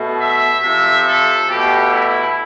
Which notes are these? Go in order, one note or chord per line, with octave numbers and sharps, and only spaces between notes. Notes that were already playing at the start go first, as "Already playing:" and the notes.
Already playing: B2 A3
E5
C3 F3 A3
A4
B2 A3 G4
E4